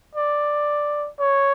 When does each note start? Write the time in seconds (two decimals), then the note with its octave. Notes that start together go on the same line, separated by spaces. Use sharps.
0.15 D5
1.19 C#5